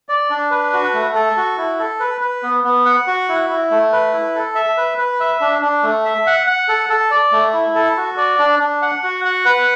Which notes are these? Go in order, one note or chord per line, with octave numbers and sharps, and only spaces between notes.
D5
D4
B4
F#4
A3
A4
F#4
E4
A4
B4
B4
B3
B3
F#5
F#4
E4
E4
A3
B4
E4
A4
E5
B4
B4
E5
D4
D4
A3
E5
F#5
F#5
A4
A4
D5
A3
E4
A4
F#4
D5
D4
D4
F#5
F#4
F#5
B4